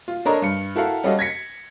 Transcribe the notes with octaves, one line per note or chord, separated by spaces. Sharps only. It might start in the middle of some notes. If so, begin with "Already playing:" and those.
F4
D4 A4 A#4 C#5 D#5 A#5
G2 C#7
E4 F#4 A4 A#4 F5
G3 C#4 F#4 A4 D#5 F5
G#6 A#6 B6 C#7